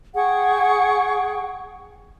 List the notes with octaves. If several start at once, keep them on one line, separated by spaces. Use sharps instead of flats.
G#4 F#5 G5 C#6